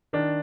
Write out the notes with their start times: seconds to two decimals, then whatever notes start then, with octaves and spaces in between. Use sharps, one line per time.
0.13 D#3 D4